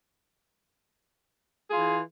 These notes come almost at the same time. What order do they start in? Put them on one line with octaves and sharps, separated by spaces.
G#4 F4 E3